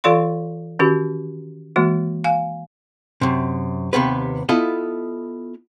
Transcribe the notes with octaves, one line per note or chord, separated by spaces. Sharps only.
E3 F4 A4 D5 F5 C6
D#3 C#4 F#4 G4
E3 G#3 A#3 F#4
F5 G#5
F#2 C3
D#2 C3 B3 B4
B3 E4 F4 A4 D#5